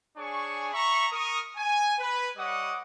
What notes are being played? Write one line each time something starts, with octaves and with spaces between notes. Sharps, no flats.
D4 G#4 C#5 G#5 C#6
E5 A#5 B5 C#6
A#4 C#6 D#6
G#5
B4
G3 C#5 D#5 F#5 D6 D#6